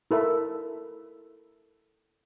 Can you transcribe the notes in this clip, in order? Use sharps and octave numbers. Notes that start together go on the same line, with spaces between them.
E4 A4 A#4 E5